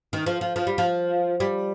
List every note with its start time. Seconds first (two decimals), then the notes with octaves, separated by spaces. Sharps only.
0.13 D#3
0.26 F3
0.41 F3
0.56 F3
0.67 G3
0.78 F3
1.40 G3